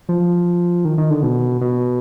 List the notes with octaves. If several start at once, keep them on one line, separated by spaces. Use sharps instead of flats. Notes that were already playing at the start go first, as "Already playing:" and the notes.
F3
D#3
D#3
D3
B2
B2